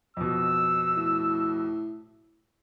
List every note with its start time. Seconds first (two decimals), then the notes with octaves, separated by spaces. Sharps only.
0.17 F2 B2 E6
0.97 A2